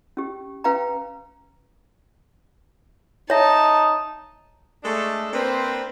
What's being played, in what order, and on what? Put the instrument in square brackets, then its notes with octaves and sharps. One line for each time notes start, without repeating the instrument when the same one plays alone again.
[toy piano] C#4 G4
C#4 B4 F5 G5 A#5
[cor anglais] D#4 [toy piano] C#5 E5 [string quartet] A5
[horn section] G#3 A3 D4 A4
A#3 C4 D4 B4 C5